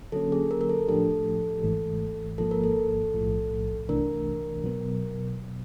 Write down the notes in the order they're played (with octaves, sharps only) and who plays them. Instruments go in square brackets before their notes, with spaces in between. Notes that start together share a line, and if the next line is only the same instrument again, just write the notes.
[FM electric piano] D3 F#3 A#3 C#4 [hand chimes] A4
[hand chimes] G#4
A#4
A#4
A4
[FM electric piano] A2 F3 A3 D4 G4 [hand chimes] A4
[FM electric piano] G#1 G#2 E3 A3
[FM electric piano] G#1 G#2 F3 A#3 [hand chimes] A4
[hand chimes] A#4
A4
[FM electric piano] B1 A2 F3 A3
[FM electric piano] C2 C3 E3 A3 D4 [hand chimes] A#4
[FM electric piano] B2 F#3 B3